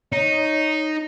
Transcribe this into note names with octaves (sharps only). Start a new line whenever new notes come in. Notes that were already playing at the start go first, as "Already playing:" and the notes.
D#4 C#5